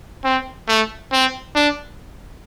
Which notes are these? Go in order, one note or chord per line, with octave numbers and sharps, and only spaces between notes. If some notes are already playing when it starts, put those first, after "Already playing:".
C4
A3
C4
D4